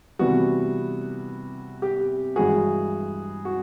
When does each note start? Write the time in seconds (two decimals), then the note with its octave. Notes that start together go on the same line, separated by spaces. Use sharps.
0.19 C3 E3 G3 B3 F#4
1.82 G4
2.36 G2 E3 G#3 F#4 G#4
3.45 F#4